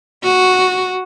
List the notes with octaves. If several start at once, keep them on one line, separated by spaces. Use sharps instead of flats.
F#4